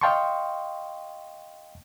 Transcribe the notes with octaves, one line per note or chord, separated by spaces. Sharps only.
D#5 F5 G5 A5 C6 C#6